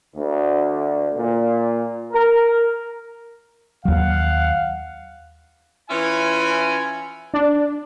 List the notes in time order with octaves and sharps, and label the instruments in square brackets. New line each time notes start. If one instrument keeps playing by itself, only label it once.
[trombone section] D2
A#2
A#4
[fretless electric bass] D#2 F#3 [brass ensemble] F5 F#5
[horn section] E3 C#4 E4 F4 G#5
[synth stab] D4